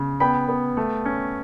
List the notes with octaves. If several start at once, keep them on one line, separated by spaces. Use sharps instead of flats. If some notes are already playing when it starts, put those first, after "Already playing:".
Already playing: C#3
B3 G5 B5
B3
A3
C#4